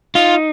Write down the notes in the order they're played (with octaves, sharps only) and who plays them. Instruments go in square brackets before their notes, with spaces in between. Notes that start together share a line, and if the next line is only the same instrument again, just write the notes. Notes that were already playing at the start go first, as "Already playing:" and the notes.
[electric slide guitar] D#4 [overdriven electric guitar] F4